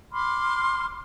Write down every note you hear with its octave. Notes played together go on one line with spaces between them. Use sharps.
B5 C6 D6 F6